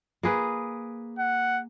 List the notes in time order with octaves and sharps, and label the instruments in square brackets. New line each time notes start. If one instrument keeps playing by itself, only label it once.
[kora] A#3 G#4 B4
[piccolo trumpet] F#5